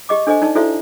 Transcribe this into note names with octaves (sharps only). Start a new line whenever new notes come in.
G4 D#5 D6
D4 A4 C5 D#5 G#5
D#4 D5 A5
E4 F#4 A4 C5 D5 E5